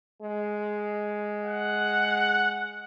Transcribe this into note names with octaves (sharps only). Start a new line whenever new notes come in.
G#3
F#5